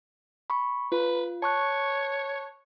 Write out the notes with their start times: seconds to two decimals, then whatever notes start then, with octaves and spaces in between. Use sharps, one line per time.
0.50 B5 C#6
0.92 F4 B4
1.42 C#5 A5 C#6 F#6